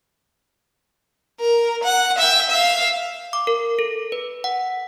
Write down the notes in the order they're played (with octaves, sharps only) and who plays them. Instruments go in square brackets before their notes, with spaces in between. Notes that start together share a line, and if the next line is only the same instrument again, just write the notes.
[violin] A#4
F#5
E5 G5
E5 F5
[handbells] D6
A#4
A4
B4
F#5